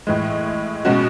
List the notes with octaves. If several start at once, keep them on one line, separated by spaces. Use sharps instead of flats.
A2 E3 G#3
B2 G#3 C#4 F#4